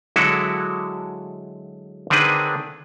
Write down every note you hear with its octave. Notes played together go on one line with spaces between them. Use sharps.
D3 F#3 G#3 E4 F#4 A4
D3 D#3 C4 D4 G#4 B4